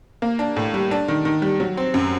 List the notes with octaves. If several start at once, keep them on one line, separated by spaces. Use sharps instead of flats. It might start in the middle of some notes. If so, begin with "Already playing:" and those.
A#3
D4
A2
G3
D4
D#3
D#3
G3
F#3
C4
F#2